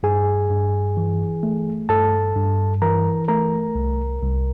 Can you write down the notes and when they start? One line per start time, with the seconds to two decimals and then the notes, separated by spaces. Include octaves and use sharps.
0.03 G2 G#4 G#5
0.50 G2
0.97 E3
1.43 A3
1.89 G2 A4 A5
2.36 G2
2.82 E3 A#4 A#5
3.28 A3 A#4 A#5
3.75 C2
4.22 C2